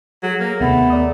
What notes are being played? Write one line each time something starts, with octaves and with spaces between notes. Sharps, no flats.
F#3 G#4 A4 C#5
A#3
D#2 C3 D#3 A3 B3
A#4 D5 D#6